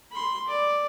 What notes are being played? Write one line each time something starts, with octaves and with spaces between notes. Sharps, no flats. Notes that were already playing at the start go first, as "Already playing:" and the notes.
B5 C6
D5